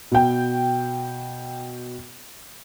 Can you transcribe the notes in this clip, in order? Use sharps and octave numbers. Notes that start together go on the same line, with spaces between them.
B2 G5